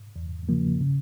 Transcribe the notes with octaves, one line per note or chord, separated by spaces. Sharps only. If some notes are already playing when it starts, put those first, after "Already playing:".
E2
C#3 F3 A#3
C#3